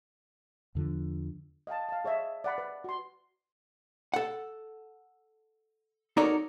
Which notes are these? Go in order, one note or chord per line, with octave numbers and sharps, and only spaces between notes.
E2 D3 F3
D#5 F5 G5 A5
F5 A5
G#4 C#5 D#5 E5
D5 F#5 B5
B4
F#4 C6
A4 F#5
D#4 F#4 A4 A#4 C#5 D5